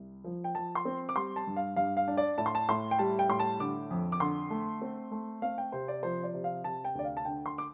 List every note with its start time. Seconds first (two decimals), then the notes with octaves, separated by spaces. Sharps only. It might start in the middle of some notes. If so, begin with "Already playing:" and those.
Already playing: C2
0.24 F3
0.44 G5
0.55 F3 A5
0.75 C6
0.85 C4
1.09 D6
1.16 G3 C6
1.36 A5
1.47 G2
1.56 F5
1.76 G2 F5
1.97 F5
2.08 D4
2.17 D5
2.38 A2 A5
2.46 C6
2.55 A5
2.69 A2 C6
2.91 G5
2.99 G3 A5
3.19 G5
3.29 A2 C6
3.40 A5
3.59 D3 D6
3.91 F2
4.12 D6
4.20 D3 C6
4.50 A3
4.82 C4
5.11 A3
5.42 C4 F5
5.58 G5
5.72 C3 C5
5.88 D5
6.03 F3 C5
6.23 D5
6.34 C3
6.44 F5
6.64 C3 A5
6.85 G5
6.95 D2 D5
7.04 F5
7.17 A5
7.25 D3 G5
7.46 C6
7.58 D6